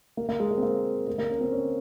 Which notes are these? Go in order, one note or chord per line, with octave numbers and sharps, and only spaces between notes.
A#3
A#3
G#3
A#3
C4
A#3
A#3
A#3
C#4
C4
C#4